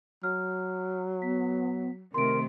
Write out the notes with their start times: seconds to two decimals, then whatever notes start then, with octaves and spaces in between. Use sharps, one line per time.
0.23 F#3 F6
1.22 B3 B6
2.14 C3 D#3 A3 A#4 C6 D7